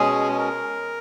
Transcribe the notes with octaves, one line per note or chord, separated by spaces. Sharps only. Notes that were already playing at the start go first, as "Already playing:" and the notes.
Already playing: B2 G#3 C#4 G#4
A#4